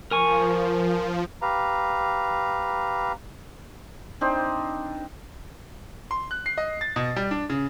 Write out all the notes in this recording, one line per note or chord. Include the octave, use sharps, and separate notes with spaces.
F3 A#4 G#5 C#6
G4 B4 F5 A#5
C4 D4 D#4 C5
C6
F#6
C7
D#5
A6
B2
G3
D4
C#3